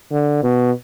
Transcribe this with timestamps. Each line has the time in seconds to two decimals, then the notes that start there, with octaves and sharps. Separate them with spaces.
0.12 D3
0.43 B2